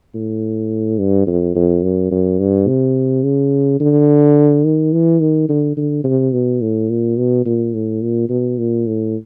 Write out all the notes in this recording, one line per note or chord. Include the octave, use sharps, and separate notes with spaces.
A2
G2
F2
F2
F#2
F#2
G2
C3
C#3
D3
D#3
E3
D#3
D3
D3
C3
B2
A2
A#2
B2
A#2
A2
A#2
B2
A#2
A2